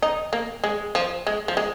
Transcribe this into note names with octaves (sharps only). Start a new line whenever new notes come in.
D#4
A#3
G#3
F3
G#3
F3
G#3